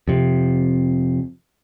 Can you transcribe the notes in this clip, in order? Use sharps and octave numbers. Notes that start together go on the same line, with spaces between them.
F2 C3